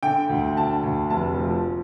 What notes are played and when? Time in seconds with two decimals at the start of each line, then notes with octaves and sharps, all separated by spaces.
0.03 D3 G5
0.30 D2
0.57 D3 A5
0.83 D2
1.10 F1 A5
1.38 F3